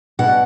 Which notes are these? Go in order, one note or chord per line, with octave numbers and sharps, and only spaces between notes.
B2 F#5